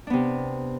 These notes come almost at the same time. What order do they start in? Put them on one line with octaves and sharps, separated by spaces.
D4 B3 C3